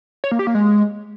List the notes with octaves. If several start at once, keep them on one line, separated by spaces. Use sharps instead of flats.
C#5
A#3
G4
A#3
G#3